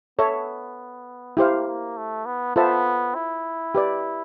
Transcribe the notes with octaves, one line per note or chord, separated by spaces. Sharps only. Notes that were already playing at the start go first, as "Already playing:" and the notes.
B3 A4 C#5 E5
A#3 E4 G4 C5 F5
A#3
A3
B3
B3 F4 A4 C5 E5 A5
E4
G4 B4 D5